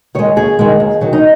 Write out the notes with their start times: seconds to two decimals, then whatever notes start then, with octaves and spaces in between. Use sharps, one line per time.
0.15 D#3 G#3 C#5
0.36 D#2 G#4
0.59 D#3 G#3
0.80 D#2
1.01 D#3 F#3
1.13 D#4